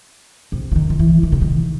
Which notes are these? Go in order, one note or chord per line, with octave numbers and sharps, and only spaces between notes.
C3
E3
D#3
D#3
E3
D#3
C3
D#3